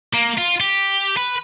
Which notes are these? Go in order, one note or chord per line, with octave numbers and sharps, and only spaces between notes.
A#3
F4
G4
B4